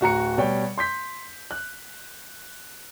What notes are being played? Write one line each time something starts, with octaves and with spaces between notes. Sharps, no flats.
D1 F#4 A#5 C#7
B2 G3 C#5 G5
C6 G6 B6
F#6